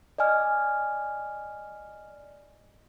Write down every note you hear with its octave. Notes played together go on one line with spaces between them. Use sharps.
D5 D#5 G#5 F6